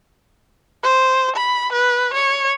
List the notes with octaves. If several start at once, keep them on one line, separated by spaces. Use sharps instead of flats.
C5
B5
B4
C#5